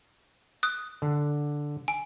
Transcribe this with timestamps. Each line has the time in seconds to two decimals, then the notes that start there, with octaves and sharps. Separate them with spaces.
0.63 D#6 F#6
1.02 D3
1.88 G#5